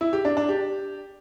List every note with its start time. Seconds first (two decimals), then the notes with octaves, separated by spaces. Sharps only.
0.01 E4
0.13 G4
0.25 D4
0.37 D4
0.49 G4